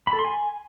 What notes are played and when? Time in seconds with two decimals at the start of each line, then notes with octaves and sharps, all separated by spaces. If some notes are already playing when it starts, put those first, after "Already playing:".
0.07 B5
0.13 A4
0.19 C6
0.25 G#5